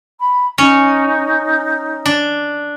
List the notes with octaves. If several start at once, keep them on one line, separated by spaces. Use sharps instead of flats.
B5
C#4 D#4
D4